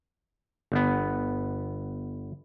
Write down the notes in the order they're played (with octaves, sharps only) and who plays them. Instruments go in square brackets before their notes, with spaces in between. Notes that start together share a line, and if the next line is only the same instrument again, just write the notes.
[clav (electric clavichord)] G1 B3